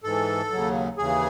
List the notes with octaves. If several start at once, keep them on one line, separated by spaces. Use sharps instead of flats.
G#2 E3 A4
D#2 C#3 F#3
D#2 C#3 E3 G#4